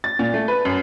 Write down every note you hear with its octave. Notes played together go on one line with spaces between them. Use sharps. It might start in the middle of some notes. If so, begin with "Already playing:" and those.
A6
A#2
A3
B4
F#2